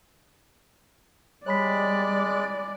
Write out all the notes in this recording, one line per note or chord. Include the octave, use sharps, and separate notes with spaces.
G3 G#3 C#5 D5 B5 F#6 B6